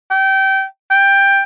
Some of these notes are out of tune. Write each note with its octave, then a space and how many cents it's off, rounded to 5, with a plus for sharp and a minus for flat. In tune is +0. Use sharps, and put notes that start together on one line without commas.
G5 -25
G5 +10